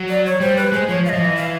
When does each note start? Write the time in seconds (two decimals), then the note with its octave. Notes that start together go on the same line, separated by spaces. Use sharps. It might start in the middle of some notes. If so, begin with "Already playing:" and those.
Already playing: F#3
0.09 D5
0.26 C#5
0.40 G3 C5
0.57 B4
0.72 G#3 C5
0.88 F3 C#5
1.05 F5
1.09 F3 D#5
1.21 E3
1.36 F5